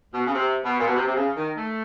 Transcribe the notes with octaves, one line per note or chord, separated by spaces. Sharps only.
B2
C#3
C3
B2
A#2
B2
C3
C3
C#3
D#3
A3